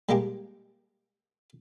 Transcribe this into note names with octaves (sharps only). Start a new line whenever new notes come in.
G3 G#3 A#3 G4